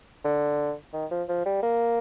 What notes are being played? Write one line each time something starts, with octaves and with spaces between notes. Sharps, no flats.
D3
D#3
F3
F3
G3
A#3